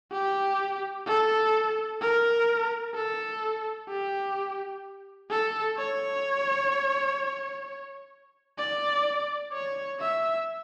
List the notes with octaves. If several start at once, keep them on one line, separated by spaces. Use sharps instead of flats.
G4
A4
A#4
A4
G4
A4
C#5
D5
C#5
E5